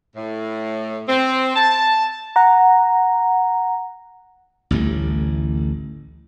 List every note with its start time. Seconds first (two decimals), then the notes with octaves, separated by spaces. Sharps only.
0.16 A2
1.08 C4
1.55 A5
2.36 F#5 A#5
4.71 A1 D2 A2 G3